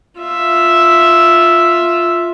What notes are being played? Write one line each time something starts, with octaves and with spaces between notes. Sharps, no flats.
F4 E5